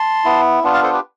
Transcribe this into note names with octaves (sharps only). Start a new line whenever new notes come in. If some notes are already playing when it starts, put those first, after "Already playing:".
Already playing: A5 C6
B3 E4
B3 D4 F4
F5 A5
A4 C5
G4 B4